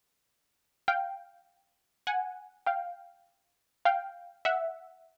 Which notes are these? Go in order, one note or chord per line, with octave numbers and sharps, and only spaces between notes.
F5 G5
F#5 G#5
F5 G5
F5 G5
E5 F#5